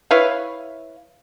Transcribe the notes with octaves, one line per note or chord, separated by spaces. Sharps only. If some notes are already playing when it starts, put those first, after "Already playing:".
E4 B4 C#5 F5